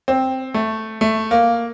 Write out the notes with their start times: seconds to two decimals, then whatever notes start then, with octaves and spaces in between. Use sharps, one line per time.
0.08 C4
0.54 A3
1.01 A3
1.31 A#3